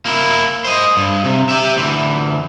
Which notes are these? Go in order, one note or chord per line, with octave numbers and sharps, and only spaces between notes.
A#3 E4
C5 D#5
G2
C3
G4 E5
D2 E3